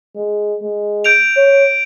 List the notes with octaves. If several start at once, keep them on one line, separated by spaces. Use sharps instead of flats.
G#3
G#3
G6 D7 F7
C#5